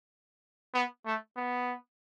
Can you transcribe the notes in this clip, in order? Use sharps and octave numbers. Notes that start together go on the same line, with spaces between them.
B3
A3
B3